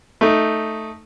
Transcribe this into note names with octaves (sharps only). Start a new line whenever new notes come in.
A3 D#4